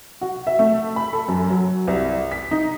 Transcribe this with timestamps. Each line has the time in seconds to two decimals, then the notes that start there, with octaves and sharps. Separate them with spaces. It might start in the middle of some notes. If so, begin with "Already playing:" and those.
0.21 F#4
0.47 E5
0.59 A3
0.96 B5
1.13 A4
1.28 F#2
1.50 F#3
1.88 C2
2.32 B6
2.51 D#4